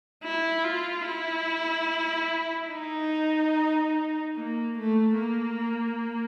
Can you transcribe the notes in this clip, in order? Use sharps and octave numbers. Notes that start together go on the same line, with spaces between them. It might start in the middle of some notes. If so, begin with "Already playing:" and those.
E4
F4
E4
D#4
A#3
A3
A#3